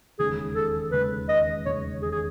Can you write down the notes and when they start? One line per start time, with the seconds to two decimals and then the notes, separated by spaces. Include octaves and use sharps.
0.18 E1 D#2 C#3 G#3 C#4 G#4
0.55 A4
0.92 E1 D#2 C#3 G#3 C#4 B4
1.29 D#5
1.66 E1 D#2 C#3 G#3 C#4 C#5
2.02 G#4
2.12 G#4